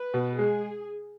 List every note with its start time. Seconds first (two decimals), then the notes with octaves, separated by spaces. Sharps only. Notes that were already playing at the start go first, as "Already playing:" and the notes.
Already playing: B4
0.14 B2
0.38 G#3 G#4